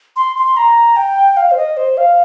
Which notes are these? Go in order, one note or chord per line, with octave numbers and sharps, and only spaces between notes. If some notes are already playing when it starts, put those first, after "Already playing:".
C6
C6
A#5
G5
F5
C5
D#5
C5
F5